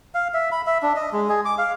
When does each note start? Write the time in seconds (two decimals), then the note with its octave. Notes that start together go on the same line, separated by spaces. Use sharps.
0.15 F5
0.34 E5
0.52 B5
0.67 E5
0.82 D4
0.96 D#5
1.13 G#3
1.29 G#4
1.45 D6
1.58 F5